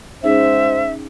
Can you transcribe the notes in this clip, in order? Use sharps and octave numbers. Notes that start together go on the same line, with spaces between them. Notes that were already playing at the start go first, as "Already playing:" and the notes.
G#2 C#4 D#4 G#4 C5 E5